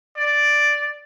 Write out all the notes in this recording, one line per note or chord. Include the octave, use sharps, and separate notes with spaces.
D5